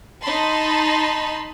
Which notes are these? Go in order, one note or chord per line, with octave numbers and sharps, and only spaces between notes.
D#4 A5 B5 C6